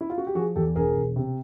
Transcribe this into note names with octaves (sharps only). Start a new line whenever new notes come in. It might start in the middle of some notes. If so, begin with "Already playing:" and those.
E4
F4
F#4
G4
F3 F#4 G#4
E2 G4 A4
E1 G#4 A#4
E1
C3